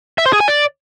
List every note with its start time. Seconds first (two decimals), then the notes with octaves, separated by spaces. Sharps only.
0.18 E5
0.26 C5
0.33 G#4
0.40 G#5
0.48 D5